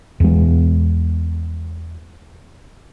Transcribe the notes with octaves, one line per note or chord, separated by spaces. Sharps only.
E2 G#3